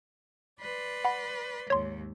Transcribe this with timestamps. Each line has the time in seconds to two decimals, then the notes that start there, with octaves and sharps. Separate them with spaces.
0.61 B4 D5 C6
1.05 F#5 B5
1.70 D#2 G#2 C#5 C6